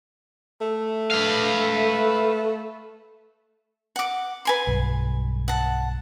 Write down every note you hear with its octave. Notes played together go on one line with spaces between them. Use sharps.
A3
B4 F5
F#5 D6
B4 G#5 C6
B1 G2 F#3
F#5 A5